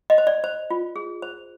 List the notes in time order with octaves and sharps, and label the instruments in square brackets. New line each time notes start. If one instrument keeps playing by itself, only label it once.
[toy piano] D#5
C5
D5
C5
F4
G#4
C5